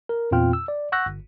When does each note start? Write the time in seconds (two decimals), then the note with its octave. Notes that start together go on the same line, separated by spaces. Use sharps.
0.09 A#4
0.31 E2 A#2 C4 F4 G5 F6
0.53 E6
0.68 D5
0.92 F#5 C#6 E6 F#6 G6 A#6
1.06 G1